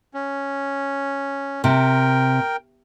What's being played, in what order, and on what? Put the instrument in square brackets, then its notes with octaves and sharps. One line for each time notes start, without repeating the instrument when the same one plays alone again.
[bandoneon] C#4
[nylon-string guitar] C3 [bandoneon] A#4 G5